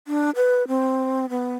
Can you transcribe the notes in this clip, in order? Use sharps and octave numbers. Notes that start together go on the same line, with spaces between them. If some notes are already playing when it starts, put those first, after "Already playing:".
D4
B4
C4
B3